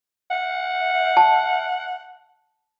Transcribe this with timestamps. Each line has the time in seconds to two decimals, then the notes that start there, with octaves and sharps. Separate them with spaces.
0.31 F#5
1.17 A5